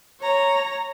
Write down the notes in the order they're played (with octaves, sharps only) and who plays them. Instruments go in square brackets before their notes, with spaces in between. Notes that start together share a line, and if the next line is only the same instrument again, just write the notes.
[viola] C#5 A#5